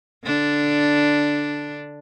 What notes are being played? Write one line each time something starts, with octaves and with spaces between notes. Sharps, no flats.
D3 D4